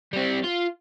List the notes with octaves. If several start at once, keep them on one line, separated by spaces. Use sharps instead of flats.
G3 C4
F4